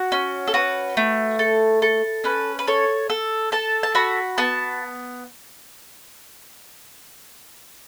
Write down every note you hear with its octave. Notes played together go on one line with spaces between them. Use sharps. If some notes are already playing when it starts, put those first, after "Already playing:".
Already playing: F#4
C#4
A4
F#4 B4
A3
A4
A4
C#4 B4
B4
A4 C#5
A4
A4 A5
A5
F#4 B5
B3 A5